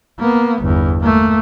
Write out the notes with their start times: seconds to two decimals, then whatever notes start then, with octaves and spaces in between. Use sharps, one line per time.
0.20 A#3 B3
0.63 G1 E2
1.01 A3 A#3